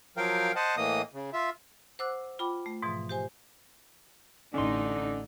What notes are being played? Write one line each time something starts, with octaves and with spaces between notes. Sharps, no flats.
F3 F#3 A#4 F5 G5
C5 D#5 F#5 A5
A2 E3 A#3 D#5 D#6
C#3
F4 E5
C5 F#5 D6 E6 F#6
F4 G5 B5 D6
A3
G#2 B2 E3 F3
G4 C5 G#5
A1 D3 C#4 D#4 C6